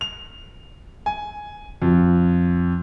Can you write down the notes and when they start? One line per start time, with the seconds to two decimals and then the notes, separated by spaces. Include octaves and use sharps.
0.01 F7
1.06 G#5
1.82 F2 F3